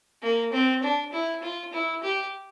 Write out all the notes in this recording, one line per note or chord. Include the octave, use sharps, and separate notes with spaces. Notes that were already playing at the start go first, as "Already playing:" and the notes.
A#3
C4
D4
E4
F4
E4
G4